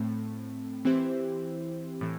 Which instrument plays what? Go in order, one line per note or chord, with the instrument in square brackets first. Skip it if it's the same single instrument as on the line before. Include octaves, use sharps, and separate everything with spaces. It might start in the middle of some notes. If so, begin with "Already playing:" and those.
Already playing: [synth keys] A2 A3 C4
E3 C4 E4 G4 C5
A2 E3